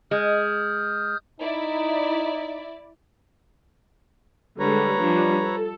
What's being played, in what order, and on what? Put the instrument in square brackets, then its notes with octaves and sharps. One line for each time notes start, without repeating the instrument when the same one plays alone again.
[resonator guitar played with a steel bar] G#3 [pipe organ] D#6 F6 G6
[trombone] D#4 [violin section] E4 D5
[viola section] D3 G3 G#3 [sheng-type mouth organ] B4 C#5 A#5
[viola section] F3 G3 D4
A4